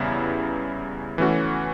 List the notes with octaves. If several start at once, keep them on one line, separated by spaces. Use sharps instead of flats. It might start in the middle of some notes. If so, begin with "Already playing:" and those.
Already playing: E2 C#3 G3 B3 E4
E3 A3 C#4 F#4